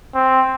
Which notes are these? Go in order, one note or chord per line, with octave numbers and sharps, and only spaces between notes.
C4